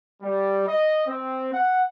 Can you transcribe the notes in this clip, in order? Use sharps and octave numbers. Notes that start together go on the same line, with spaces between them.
G3
D#5
C4
F#5